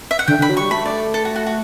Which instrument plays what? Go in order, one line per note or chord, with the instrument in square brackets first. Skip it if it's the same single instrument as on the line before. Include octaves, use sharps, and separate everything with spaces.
[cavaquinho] E5
F#5
[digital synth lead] D3 [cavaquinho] G5
[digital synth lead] D3 [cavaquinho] B5
[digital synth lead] F#3
[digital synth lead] G3 [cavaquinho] C#6
[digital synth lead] A3 [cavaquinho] B5
[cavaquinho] D5
A4
F#4
F#4
F#4